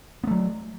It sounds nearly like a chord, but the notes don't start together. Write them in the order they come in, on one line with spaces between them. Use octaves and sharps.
B3 A3 F#3